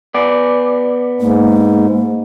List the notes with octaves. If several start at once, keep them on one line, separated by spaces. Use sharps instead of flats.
B3 D5
G#2 A#3